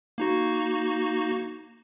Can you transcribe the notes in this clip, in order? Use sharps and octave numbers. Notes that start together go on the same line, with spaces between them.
A#3 D#4 F#4